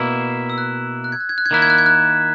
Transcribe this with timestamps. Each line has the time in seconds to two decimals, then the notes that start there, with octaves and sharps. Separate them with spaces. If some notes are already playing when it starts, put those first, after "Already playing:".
Already playing: B2 A#3 E4 E6
0.50 E6
0.58 F#6
1.04 F#6
1.12 G#6
1.20 F#6
1.29 G#6
1.38 F#6
1.46 G#6
1.51 D#3 A#3 E4 F#6
1.62 G#6
1.70 F#6
1.78 G#6
1.86 F#6